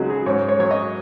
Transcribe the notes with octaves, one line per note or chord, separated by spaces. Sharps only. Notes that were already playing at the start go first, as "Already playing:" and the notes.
Already playing: C#2 C#3 F#3 D#4 F#4
G#4
G#2 C#5
C#5
F#3 C#5
D#5